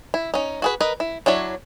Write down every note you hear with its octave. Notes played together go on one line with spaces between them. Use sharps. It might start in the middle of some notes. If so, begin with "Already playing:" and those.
E4
C#4 D#4
F#4 G#4 B4
A#4 B4 D#5
E4
F#3 D4 E4 C#5